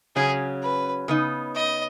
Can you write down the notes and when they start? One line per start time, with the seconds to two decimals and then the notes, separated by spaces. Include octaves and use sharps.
0.16 C#3 F#3 C#4 G#4
0.62 B4
1.08 C#3 B3 D#4
1.55 D#5